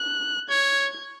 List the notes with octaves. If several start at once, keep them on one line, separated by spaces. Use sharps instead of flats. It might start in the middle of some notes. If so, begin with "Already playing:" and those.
Already playing: F#6
C#5 G#6